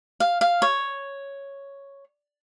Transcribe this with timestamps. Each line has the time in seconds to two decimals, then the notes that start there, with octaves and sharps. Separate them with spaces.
0.20 F5
0.41 F5
0.62 C#5